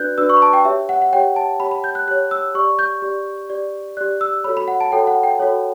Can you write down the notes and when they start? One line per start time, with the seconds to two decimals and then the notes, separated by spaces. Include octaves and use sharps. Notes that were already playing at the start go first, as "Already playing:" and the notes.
Already playing: D4 F#4 B4 D5 F#6 G6
0.18 D4 F#4 B4 D5 E6
0.30 C#6
0.37 B5
0.42 A5
0.53 G5
0.65 G4 C#5 E5
0.89 F#5
1.02 F#5
1.13 G4 C#5 G5
1.36 A5
1.60 G4 C#5 B5
1.71 B5
1.84 G6
1.95 F#6
2.07 G4 C#5 F#6
2.31 E6
2.55 G4 D5 C#6
2.79 G6
3.02 G4 D5
3.50 G4 D5
3.97 G4 D5 F#6
4.21 E6
4.44 F#4 A4 C#5 B5
4.57 B5
4.68 F#5
4.81 A5
4.92 F#4 A4 C#5 G5
5.07 F#5
5.23 G5
5.39 F#4 A4 C#5